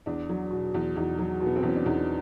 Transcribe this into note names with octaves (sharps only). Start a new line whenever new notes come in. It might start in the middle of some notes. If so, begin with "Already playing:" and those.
E2 D4
F#3
B2
E2
E2 D#4
F#3
B2
B3
C4
E2 C#4
D4
E2 D#4